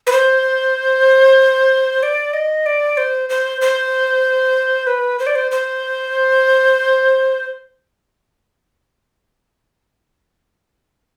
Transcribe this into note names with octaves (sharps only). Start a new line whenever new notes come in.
B4
C5
D5
D#5
D5
C5
C5
C5
B4
C5
D5
C5
C5